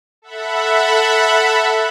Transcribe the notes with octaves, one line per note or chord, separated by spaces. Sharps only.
A4 E5 F#5 B5